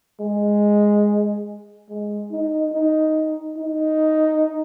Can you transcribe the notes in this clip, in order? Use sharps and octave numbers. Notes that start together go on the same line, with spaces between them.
G#3
G#3
D#4
D#4
D#4